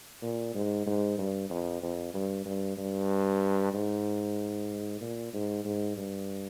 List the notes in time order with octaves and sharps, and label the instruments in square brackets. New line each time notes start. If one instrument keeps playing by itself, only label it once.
[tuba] A#2
G#2
G#2
G2
F2
F2
G2
G2
G2
G#2
A#2
G#2
G#2
G2